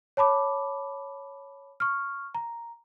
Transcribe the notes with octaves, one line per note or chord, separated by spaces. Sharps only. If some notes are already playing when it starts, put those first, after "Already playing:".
C#5 A5 B5 D6
C#6 F6
A#5